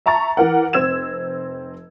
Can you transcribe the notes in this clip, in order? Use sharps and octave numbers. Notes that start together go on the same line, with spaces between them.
E5 A5 A#5 C#6 A6
E3 A#4 F#5
F1 C4 E6 G#6 E7